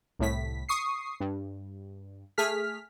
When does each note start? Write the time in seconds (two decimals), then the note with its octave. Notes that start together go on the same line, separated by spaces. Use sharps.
0.19 C2 A2 B6
0.69 C#6 D#6 C7
1.20 G2
2.38 A3 G#4 F6 B6